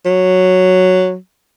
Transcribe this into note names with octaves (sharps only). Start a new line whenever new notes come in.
F#3